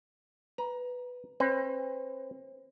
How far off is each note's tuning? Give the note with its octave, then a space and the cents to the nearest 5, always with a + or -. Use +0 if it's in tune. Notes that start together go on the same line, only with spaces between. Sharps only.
B4 +5 A#5 +20
C4 +40 B4 +40